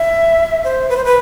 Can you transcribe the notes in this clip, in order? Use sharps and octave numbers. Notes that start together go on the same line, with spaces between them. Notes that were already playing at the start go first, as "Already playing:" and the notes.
Already playing: E5
C5
B4
C5
B4